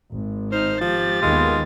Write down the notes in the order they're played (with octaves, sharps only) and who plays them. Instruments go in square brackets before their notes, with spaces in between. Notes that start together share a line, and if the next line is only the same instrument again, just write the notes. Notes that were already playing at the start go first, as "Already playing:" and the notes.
[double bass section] G#1
[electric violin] D#4 F6 [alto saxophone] C5
[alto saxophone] F3 [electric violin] G4 A6
[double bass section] D#2 D#3 B3 [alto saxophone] G#3 [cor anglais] F4